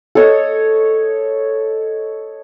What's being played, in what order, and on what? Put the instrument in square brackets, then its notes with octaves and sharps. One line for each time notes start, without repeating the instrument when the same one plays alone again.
[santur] A4 C#5 D#5